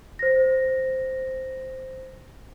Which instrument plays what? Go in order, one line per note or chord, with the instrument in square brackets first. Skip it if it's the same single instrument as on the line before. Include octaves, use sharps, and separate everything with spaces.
[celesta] C5 A#6